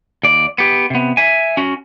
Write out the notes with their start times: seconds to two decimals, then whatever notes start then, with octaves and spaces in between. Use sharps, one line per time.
0.23 D#2 D5
0.58 B3 G4
0.90 C3 B3
1.17 E5 G#5
1.57 C#4 F#4